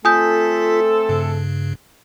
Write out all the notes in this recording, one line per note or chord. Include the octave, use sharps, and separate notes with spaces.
A3 C4 F4 A4 G#5 D#6 G6 B6
G2 C#3